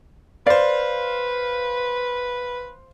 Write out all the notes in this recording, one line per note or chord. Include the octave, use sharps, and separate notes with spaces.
B4 C5 D5 F5